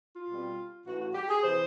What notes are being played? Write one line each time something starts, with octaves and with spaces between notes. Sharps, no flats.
F4
B2 G3 C4
A2 E3 A3 C#4 F#4
F#4
G4
G#4
C3 E3 C5